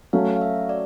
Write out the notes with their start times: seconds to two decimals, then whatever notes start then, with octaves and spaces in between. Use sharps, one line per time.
0.13 F#3 A3 C#4 F5
0.36 F5
0.41 E5
0.69 D5